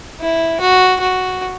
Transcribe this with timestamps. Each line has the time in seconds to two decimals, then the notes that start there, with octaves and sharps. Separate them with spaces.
0.20 E4
0.60 F#4
1.01 F#4